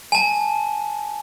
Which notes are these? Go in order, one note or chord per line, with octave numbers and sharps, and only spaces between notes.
G#5 A5